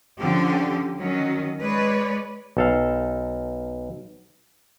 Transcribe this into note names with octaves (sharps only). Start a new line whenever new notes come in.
D3 F3 C#4 G4
D#3 F#3 C#4
G#3 B4 C#5 D5
B1 A4 F5